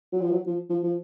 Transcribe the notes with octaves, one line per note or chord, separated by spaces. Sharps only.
F#3
F3
F#3
F3
F3
F3